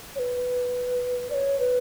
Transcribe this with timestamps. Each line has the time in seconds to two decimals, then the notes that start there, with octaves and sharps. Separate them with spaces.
0.15 C#5
0.19 B4
1.30 D5
1.34 C#5
1.59 B4